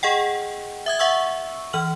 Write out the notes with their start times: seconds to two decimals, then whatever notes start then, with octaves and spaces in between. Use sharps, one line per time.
0.03 G#4 D#5 F#5 G5
0.86 E5 D#6 G#6
0.99 E5 F#5 C#6 E6
1.73 E3 F6 F#7